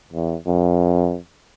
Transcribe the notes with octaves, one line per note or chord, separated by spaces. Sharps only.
E2
F2